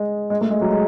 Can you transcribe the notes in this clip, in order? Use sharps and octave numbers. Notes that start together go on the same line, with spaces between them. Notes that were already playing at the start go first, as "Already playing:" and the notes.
Already playing: G#3
G#3
A3
G#3
F#3
G#3